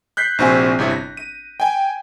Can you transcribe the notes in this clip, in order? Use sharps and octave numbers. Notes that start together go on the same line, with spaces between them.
F#6 G6 B6 C7
A#1 C3 C4 F#4 G#5
G1 C3 E4
A#6
D#7
G5 G#5